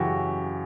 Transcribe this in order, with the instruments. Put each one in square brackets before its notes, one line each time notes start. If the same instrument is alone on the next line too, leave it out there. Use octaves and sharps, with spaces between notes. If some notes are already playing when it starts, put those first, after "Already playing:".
Already playing: [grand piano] F#2 C#3 E3 F#4 G4